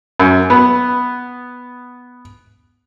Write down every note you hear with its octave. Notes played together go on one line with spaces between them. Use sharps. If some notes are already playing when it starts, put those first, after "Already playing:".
F#2
B3